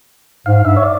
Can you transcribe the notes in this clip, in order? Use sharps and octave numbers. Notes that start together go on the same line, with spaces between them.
G#2 F5
G2 E5
C#5
D5